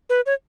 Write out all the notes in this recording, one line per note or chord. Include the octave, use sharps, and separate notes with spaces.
B4
C#5